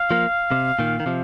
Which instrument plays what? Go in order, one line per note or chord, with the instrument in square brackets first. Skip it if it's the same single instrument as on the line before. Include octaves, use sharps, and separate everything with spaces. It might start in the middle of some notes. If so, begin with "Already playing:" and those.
Already playing: [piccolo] F5
[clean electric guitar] F3 A#3
C3
A#2 D#3
D#3
C3 F3